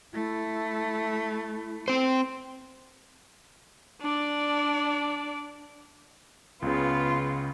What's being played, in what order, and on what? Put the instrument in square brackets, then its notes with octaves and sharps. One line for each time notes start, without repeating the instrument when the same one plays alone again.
[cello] A3 [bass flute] E4
[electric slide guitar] C4 C5
[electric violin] D4 D5
[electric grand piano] C#2 C#3 [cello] B3 F4